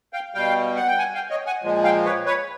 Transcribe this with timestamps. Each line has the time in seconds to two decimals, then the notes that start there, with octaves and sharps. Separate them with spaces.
0.13 F5 G5
0.35 B2 G3 F5 G5
0.76 F#5
0.87 G5
0.98 F#5 G#5
1.15 F5 G5
1.30 C#5 D#5
1.46 F#5 G#5
1.62 A#2 F3 G#3
1.84 F5 G5
2.05 B4 C#5
2.26 B4 C#5